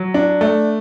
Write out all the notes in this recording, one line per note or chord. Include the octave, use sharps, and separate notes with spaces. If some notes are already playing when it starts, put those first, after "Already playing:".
Already playing: F#3
D4
A3